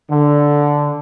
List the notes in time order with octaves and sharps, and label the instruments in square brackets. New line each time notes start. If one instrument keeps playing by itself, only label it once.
[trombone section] D3